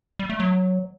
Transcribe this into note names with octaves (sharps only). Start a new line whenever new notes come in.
G3
A3
F#3